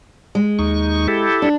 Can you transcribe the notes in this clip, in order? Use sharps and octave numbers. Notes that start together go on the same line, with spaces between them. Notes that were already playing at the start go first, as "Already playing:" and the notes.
G#3
D#2 D#4 C#6
E4 G4 A4
D4